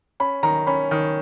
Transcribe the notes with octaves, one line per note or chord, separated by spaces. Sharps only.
C#4 B5
D#3 A#5
C#4 B5
D#3